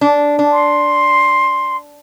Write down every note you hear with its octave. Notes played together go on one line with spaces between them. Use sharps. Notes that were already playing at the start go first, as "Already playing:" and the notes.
D4
D4
C6